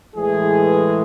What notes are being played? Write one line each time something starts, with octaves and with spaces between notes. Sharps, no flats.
A2 E3 G#3 G#4